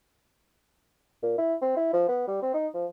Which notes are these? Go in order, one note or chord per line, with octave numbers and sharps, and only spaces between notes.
A#2
E4
C4
E4
F3
B3
G3
C4
D#4
F3